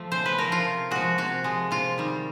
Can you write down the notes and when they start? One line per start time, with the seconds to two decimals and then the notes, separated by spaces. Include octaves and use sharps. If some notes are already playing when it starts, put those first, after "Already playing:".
Already playing: F3 A3
0.12 C#3 C5
0.26 B4
0.38 F3 A3 A#4
0.52 F4
0.65 C3
0.91 F3 G#3 F#4
1.18 C3 F#4
1.44 F3 G#3
1.71 C3 F4
1.98 D#3 G3